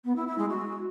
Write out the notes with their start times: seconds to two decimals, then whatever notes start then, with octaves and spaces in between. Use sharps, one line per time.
0.05 B3
0.16 E4
0.27 E4
0.38 G#3
0.49 F#4